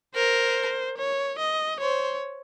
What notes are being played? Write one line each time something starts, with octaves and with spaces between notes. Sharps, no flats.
A#4 C5
C#5
D#5
C5 C#5